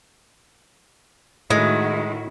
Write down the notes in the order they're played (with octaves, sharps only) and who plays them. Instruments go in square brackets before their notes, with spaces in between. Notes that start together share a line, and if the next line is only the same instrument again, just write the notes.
[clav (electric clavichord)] A2 [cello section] D#3 E4 F#4 [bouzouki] G#3